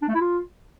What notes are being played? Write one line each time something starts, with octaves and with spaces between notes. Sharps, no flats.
D4
A3
E4
F4